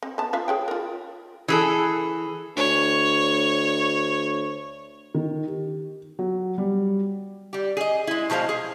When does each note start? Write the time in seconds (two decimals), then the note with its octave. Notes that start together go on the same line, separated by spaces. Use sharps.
0.03 C4
0.18 B3 A5
0.33 F4 E5 F5
0.48 G#4 C#5 G5
0.68 F4 A#4
1.48 E3 G#4 A4
2.57 D2 C#5
5.15 D#3
5.47 G4
6.19 F#3
6.58 G3
7.53 G3 G4
7.77 G#4 D#5
8.07 G#3 E4
8.30 B2 F3 G#3 C5 F5
8.49 G#4